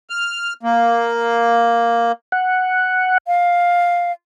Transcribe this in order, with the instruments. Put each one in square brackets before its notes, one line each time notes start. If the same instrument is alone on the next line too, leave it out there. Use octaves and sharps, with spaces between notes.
[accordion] F6
A#3
[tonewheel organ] F#5
[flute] F5